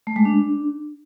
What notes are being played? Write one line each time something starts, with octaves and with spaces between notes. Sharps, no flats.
A3
G#3
D4